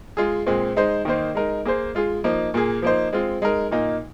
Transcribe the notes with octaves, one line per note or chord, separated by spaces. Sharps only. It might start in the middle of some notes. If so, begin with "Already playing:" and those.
G#3 F4 G#4
A#2 G#3 C4
G#3 D#4 C5
D#3 A#3 D#4 C5
G#3 D#4 A#4
A#3 G#4 C5
G#3 F4 G#4
F3 A#3 D#4
A#2 A#3 G#4
F3 A#3 D#4 C5
G#3 C4 F4
G#3 D#4 A#4
A#2 A#3 D#4